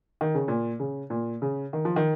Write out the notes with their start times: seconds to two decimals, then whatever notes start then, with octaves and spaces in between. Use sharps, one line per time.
0.21 D#3
0.35 C#3
0.48 A#2
0.80 C#3
1.10 A#2
1.42 C#3
1.73 D#3
1.85 F3
1.96 D#3